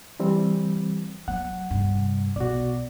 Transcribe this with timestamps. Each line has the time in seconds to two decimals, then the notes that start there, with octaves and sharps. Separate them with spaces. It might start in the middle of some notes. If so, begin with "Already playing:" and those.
0.20 E3 G3 C4
1.28 F#3 F#5
1.71 G2 C3
2.36 B1 F#4 D5